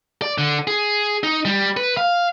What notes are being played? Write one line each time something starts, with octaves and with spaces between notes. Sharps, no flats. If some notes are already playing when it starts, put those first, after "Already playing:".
D5
D3
G#4
D#4
G3
B4
F5